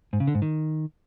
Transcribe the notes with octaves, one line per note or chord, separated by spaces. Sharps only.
G#2
C#3
D3
G#2
D#3